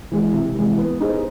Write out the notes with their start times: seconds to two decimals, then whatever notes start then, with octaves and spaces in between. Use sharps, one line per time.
0.12 E3 G#3
0.33 C3
0.55 E3 G#3
0.78 B3
1.00 D#4 G#4 C5